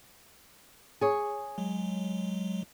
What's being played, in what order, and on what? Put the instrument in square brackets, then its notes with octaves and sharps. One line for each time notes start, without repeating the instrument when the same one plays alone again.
[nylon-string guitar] G#4 C#5
[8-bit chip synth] F#3 G#3